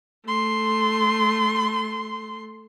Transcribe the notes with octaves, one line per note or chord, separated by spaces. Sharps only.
A3 C6